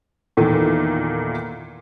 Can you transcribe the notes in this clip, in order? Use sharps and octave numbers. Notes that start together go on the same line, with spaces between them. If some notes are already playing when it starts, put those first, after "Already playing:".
E2 A#2 D#3 E3 A3